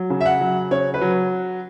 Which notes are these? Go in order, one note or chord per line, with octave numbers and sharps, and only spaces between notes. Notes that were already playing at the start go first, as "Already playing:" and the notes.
Already playing: F#3
C#3
E5
F#5
F#3
C#3 C#5
B4
F#3